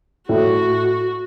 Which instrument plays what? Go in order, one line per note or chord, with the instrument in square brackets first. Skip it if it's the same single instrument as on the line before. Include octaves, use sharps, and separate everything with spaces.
[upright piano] A2 [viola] F#4